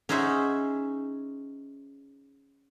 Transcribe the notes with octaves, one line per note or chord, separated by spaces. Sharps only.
C#4 D#4 G#4 C5 E5 F#5